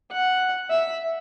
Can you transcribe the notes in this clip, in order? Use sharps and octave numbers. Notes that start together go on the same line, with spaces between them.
F#5
E5